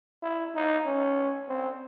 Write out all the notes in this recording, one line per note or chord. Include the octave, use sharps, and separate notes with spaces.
E4
D#4
C#4
C4